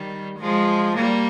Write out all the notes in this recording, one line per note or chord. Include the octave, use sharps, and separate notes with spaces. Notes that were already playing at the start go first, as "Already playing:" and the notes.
Already playing: D#3 G3
F3 G#3
G3 A#3